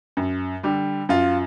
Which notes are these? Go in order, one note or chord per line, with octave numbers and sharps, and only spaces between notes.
F#2
D3 G3
F#2 F4